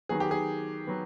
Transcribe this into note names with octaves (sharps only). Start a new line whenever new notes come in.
D#3 F#3 B3 G#4
G4
G#4
F#3 B3